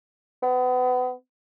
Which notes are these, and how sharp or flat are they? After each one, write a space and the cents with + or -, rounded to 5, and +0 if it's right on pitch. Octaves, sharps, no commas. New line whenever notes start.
B3 +30